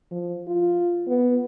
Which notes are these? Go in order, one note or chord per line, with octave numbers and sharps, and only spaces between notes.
F3
F4
B3